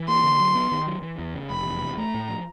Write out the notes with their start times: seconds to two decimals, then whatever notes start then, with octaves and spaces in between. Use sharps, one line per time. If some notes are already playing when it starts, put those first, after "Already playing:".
Already playing: E3
0.08 A#3 C6
0.24 D3
0.40 F#3
0.55 B3
0.72 D#3
0.86 F#3
1.02 E3
1.18 E2
1.34 C#3
1.50 F1 B5
1.65 E2
1.81 C3
1.97 A3 A#5
2.14 A2
2.29 F3